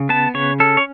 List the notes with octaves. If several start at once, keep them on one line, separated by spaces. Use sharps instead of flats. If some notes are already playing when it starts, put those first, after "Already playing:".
Already playing: C#3
B3 A5
C#3 C#5
C#4 A4
C#5